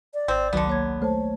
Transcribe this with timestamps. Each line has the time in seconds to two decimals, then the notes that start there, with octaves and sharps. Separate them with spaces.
0.14 D5
0.28 G#1 C4
0.53 C#2 D3 D#3 F#3 B3
0.67 A#3 C#5 G#6
1.02 A3 C5 C#5 A5